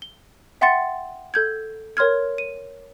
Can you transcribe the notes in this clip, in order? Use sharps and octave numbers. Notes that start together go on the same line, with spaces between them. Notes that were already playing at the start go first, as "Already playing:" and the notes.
G7
E5 F#5 G5 C6 A6 C#7
A4 G6 G#6
A#4 C#5 C6 F6 G#6
D#7